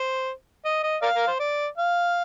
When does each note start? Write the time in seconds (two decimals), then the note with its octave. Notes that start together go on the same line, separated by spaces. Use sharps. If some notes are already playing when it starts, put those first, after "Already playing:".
Already playing: C5
0.65 D#5
0.83 D#5
1.02 A#4 D5 F5
1.15 A#4
1.28 C5
1.39 D5
1.78 F5